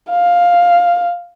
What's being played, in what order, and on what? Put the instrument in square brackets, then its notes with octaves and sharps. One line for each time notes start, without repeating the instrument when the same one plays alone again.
[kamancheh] F5